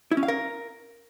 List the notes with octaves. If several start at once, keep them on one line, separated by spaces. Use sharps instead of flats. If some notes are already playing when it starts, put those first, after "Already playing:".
E4
C#4
F5
A#4